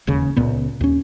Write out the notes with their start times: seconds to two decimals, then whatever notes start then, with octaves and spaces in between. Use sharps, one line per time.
0.07 E1 D#2 C#3
0.36 C#2 A#2 B3
0.81 D#2 C#4